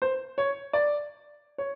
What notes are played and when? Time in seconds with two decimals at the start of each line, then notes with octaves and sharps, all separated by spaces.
0.02 C5
0.38 C#5
0.73 D5
1.58 C#5